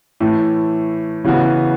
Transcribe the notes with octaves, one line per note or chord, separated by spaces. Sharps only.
A2 E3 A3
C#3 E3 B3 F#4